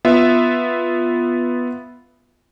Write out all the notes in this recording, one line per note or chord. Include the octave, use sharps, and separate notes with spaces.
B3 F4 E5